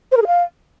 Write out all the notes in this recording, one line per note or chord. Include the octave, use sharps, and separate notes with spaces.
C5
A#4
G#4
F5